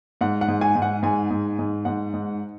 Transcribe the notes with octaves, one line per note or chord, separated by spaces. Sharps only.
G#2 F#5
F#5
G#2
G#5
G#2
F#5
G#2 G#5
G#2
G#2
G#2 F#5
G#2